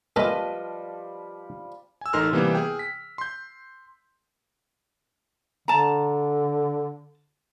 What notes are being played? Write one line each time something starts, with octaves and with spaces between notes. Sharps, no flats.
C#2 A#2 F3 G3 A3 B4 D#5 C6
G#5 E6
A1 D#4 A4 A#4 C6 F6
C3 E3 G3 A#3 B3
G#4 G5
B6
C6 G6
D3 A5 A#5